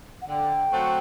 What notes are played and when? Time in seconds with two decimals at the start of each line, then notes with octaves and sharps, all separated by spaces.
0.22 F#5
0.28 D3 G5
0.72 F#3 A3 C4 F#4